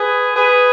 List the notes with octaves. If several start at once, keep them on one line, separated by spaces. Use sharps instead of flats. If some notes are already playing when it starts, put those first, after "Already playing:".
Already playing: G#4 B4
G#4 B4